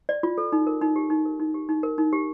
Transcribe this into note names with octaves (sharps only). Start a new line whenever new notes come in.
D5
F4
A4
D#4
A#4
D#4
G4
D#4
A#4
D#4
G4
D#4
A#4
D#4
G4